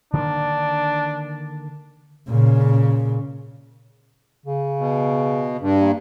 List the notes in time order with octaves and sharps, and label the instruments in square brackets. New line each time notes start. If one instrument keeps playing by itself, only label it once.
[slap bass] D3 D#3 A#3 [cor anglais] D4
[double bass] A#2 C#3
[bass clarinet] C#3
[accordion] B2
G2
[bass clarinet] A#3